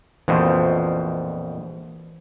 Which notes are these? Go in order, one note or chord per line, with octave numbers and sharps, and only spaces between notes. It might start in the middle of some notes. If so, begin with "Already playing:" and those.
A#1 F2 B2 E3 C5